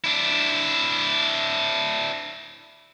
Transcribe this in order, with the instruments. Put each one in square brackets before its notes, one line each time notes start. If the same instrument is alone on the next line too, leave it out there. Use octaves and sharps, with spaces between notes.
[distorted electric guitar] D4 E4